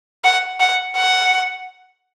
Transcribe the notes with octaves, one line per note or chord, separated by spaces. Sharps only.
F#5
F#5
F#5